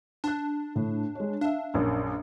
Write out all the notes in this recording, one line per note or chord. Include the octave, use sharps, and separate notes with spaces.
D4 A5 F#6
A2
G#3 C#5
D4 E5 F5
A#1 F#2 A#4